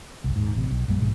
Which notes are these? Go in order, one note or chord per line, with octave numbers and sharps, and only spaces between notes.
F#1 C2
D#1 G#2
A1 C3
B1
A#1 F#2 G3 A#3
A#1 G#2 B2 G#3